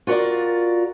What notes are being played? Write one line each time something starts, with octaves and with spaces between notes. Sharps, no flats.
F4 F#4 A#4 D5